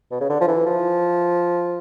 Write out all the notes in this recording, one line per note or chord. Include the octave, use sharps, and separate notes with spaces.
B2
C#3
D3
F3
E3
F3